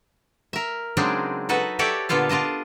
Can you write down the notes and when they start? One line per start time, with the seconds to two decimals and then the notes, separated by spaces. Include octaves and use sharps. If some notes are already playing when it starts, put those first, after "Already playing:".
0.53 A#4 E5
0.97 C#3 F#3 G#3 C4 D4 D#4
1.49 D#4 F#4 A4 B4 F#5
1.79 F#4 G4 A4 C#5 D5 E5
2.09 A#2 D3 B3 F4 A4 F5
2.29 D4 F4 D#5 A5